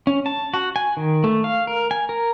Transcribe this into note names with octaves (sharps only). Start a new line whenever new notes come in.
C#4
A5
F#4
G#5
D#3
A3
F5
A#4
G#5
A#4